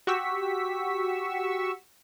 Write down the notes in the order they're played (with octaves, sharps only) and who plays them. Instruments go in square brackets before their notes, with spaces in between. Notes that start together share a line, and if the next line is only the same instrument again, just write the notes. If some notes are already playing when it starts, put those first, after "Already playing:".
[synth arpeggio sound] F#4 G4 C#6 E6 B6